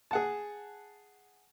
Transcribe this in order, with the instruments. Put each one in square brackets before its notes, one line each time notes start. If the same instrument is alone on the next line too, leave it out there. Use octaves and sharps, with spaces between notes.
[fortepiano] G#4 F#5 A5